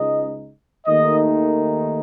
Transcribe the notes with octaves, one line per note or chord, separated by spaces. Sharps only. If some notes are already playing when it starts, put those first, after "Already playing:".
Already playing: C#2 C#3 G#3 D#4 D#5
D#2 D#3 A3 D#4 D#5